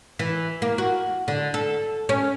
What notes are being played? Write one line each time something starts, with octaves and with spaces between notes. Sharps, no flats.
E3
A#3
F#4
D3
A4
C#4